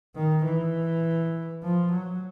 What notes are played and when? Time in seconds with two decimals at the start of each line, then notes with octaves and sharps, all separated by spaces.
0.16 D#3
0.45 E3
1.63 F3
1.92 F#3